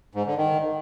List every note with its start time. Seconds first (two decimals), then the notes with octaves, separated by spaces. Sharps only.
0.15 G#2
0.26 D3
0.38 D#3